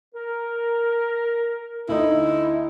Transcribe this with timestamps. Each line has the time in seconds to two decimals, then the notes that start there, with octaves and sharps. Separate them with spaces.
0.15 A#4
1.89 D2 D#4 E4